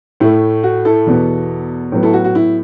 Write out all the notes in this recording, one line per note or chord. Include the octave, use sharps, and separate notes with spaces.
A2 A3 E4
F#4
E4 A4
E2 B2 B3
A2 F#3 B3
E4 A4
F#4
F#4
E4